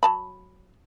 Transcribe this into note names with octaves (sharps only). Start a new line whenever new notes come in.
F#3 A5 B5